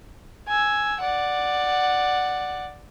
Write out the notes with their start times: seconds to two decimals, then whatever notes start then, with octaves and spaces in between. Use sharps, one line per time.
0.48 G#5 E6
1.01 D5 F#5